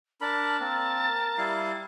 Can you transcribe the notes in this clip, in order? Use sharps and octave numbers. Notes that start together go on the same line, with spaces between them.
D4 A#4 A5 B5
A#3 C4 A#4
G3 E4 F5